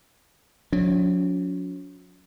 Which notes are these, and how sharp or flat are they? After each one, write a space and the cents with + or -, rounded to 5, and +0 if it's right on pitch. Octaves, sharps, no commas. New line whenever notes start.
F#3 -40 C#4 +45